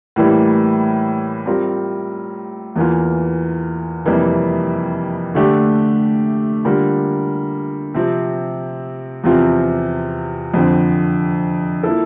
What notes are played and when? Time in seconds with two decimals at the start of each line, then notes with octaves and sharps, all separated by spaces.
0.16 A2 E3 G3 A#3
1.46 G3 C4 F4 A#4
2.76 E2 E3 A#3 F4
4.05 F2 C3 E3 G3 A#3
5.35 D3 A3 D4 G4
6.64 D3 G3 A#3 F4 A#4
7.94 C3 F3 C4
9.24 E2 C3 F3 C4 F4
10.54 F2 D3 F3 C4
11.83 F3 A#3 E4 A4